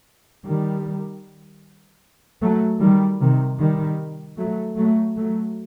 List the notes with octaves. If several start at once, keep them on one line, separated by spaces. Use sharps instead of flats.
D#3 G3
F#3 A3
D#3 G3
C3 D#3
D#3 G3
F#3 A3
F#3 A3
F#3 A3